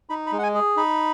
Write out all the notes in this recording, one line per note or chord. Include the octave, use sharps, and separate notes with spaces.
D#4 B5
B5
G#3
F#5
G#5
G#4
D#4 B5